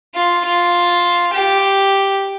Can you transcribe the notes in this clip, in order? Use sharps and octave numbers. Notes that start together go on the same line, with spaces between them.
F4
F4
G4